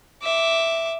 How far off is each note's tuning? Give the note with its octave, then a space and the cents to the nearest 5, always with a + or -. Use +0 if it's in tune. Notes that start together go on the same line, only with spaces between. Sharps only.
E5 +0 D6 -5